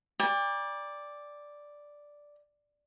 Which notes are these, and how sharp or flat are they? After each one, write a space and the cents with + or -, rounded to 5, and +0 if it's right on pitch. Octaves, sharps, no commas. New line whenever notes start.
D5 +0 G5 +40 B5 -45